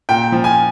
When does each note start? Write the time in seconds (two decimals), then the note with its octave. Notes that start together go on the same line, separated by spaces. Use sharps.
0.09 A#2 G5
0.32 F3
0.44 G#5